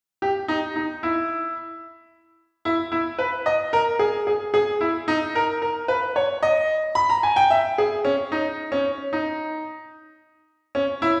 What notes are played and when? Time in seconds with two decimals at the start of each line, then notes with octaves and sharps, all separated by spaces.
0.22 G4
0.48 D#4
0.76 D#4
1.03 E4
2.65 E4
2.92 E4
3.19 B4
3.46 D#5
3.73 A#4
3.99 G#4
4.27 G#4
4.54 G#4
4.81 E4
5.08 D#4
5.35 A#4
5.62 A#4
5.88 B4
6.16 C#5
6.43 D#5
6.95 B5
7.10 A#5
7.23 G#5
7.36 G5
7.50 E5
7.78 G#4
8.05 C#4
8.32 D#4
8.72 C#4
9.13 D#4
10.75 C#4
11.02 E4